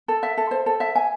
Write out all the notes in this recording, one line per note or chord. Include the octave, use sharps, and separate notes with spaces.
A4
E5
A4
C5
A4
E5
G#5